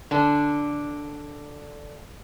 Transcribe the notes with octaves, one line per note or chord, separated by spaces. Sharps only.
D3 D4